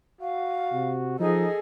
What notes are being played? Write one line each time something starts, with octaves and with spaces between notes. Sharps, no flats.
F#4 F5
C3
F3 D#4 G#4 A4 D#5